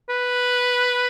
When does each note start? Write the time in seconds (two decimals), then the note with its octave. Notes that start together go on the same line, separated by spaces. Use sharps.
0.09 B4